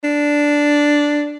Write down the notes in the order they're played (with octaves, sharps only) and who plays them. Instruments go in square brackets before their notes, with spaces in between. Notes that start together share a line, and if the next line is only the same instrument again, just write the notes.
[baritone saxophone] D4